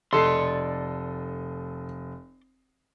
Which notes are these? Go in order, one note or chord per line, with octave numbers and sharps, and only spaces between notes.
F1 A4 D5 D#5 C6 C7